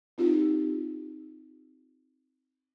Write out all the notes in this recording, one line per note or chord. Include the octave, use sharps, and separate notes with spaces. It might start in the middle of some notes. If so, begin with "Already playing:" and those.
C4 D#4 F4 G4